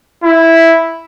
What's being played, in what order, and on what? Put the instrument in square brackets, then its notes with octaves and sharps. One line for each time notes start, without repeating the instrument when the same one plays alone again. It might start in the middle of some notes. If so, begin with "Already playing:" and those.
[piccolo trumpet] E4